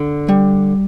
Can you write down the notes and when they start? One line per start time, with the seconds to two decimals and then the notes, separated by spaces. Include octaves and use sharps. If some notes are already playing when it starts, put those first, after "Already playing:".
Already playing: D3
0.29 G3